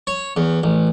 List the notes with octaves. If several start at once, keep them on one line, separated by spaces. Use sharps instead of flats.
C#5
E2
A1